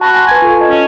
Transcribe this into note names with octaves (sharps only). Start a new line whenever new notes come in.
F#4 A5 B5 A#6
G#5 C6
B4 G#5 C#6
F4 A4 C#6
D#5 A5
C#4